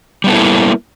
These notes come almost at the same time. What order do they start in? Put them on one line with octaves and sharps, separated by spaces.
G3 B3 A4 E4 A#3